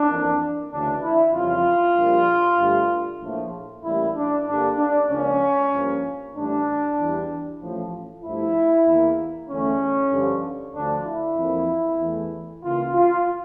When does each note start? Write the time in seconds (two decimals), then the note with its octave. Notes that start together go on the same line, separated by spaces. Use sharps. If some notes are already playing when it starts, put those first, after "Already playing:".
Already playing: D4
0.08 F2 E3 A#3
0.71 D2 C#3 E3 D4
1.02 E4
1.33 F2 C#3 E3 G3 F4
1.96 A#1 A#2 G3 A#3
2.59 G2 D3 A3
3.22 A#1 A2 F3 A3
3.84 A1 A2 G3 A#3 E4
4.16 D4
4.47 G2 D3 G3 A#3 D4
4.78 D4
5.10 C#2 C#3 F3 A#3 C#4
5.73 G2 F3 A#3
6.36 A2 E3 G3 D4
6.98 E2 E3 G3
7.61 A1 A2 F3
8.23 G2 F3 A3 E4
8.86 E2 E3 A#3
9.49 E2 D3 A3 C#4
10.12 G2 D3 F3
10.74 D2 D3 F3 D4
11.06 E4
11.38 F2 E3 A#3
12.00 E2 E3 A3
12.63 C#2 C#3 E3 A#3 F4
12.94 F4